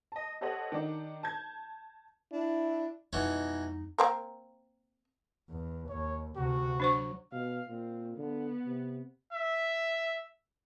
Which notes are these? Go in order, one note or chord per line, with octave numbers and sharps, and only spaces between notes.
D#5 A5
G4 A4 C5 C#5 D#5 F#5
D#3 D4 D#4
A5 G6 G#6
D4 E4
F2 B2 E3 G#3 D#4 C#5
A#3 C4 A#4
E2
D#2 C#5
D2 C3 F#4
F#3 D4 C5 C#6
B2 F5
A#2 C4
D3 B3
C3
E5